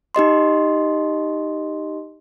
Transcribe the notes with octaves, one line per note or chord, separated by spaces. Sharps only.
D#4 G4 D#5 C6